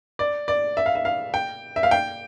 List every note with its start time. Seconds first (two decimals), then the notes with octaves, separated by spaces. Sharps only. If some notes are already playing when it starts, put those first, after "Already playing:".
0.19 D5
0.48 D5
0.77 E5
0.86 F5
0.95 E5
1.05 F5
1.34 G5
1.76 E5
1.83 F5
1.91 G5